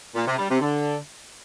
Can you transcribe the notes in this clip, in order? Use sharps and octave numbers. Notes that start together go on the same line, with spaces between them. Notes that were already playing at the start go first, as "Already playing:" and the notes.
A#2
C3
G3
C3
D3